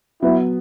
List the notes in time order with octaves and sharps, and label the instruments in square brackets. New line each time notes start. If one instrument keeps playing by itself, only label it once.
[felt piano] F#3 B3 [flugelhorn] E4